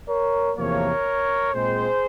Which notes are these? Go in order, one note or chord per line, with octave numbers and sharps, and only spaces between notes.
A#4 C#5
E2 C3 F3 A#3 A#4 C#5
A#2 G#3 C4 G#4 C5